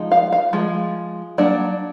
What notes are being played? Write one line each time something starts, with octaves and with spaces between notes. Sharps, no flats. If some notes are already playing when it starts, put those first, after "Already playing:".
Already playing: F3 G#3 D#4
F5
F5
F3 G#3
F#3 A#3 D4 D5